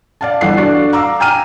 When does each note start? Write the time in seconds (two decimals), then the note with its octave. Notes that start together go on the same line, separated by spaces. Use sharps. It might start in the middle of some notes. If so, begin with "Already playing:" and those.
0.21 D5 F5 A5
0.41 G1 E3 F#5 C7
0.57 D4 F#4 A4 D5
0.93 F5 A#5 D6 E6
1.20 G5 G#5 A#5 F6 D#7